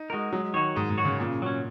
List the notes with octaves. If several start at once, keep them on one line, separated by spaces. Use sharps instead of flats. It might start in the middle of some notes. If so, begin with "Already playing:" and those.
Already playing: D#4
G#3 F#4 A#4
F#3 G#3
D#3 F#4 C#5
G#2 G#3
G#2
F#4 C#5
C#3
A#2 C#3
F#3 C#4